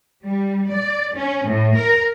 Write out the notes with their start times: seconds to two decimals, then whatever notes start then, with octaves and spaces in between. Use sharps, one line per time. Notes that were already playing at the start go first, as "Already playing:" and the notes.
0.24 G3
0.71 D5
1.16 C#4
1.47 A2
1.76 A#4